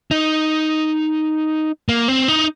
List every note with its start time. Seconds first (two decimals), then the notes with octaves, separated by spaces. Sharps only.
0.11 D#4
1.89 A#3
2.08 C4
2.28 D#4